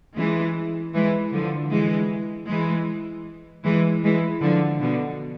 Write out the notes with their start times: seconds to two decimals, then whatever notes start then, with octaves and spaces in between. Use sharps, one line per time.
0.17 E3 G#3
0.94 E3 G#3
1.33 D3 F3
1.72 E3 G#3
2.49 E3 G#3
3.65 E3 G#3
4.04 E3 G#3
4.42 D3 F3
4.81 B2 D3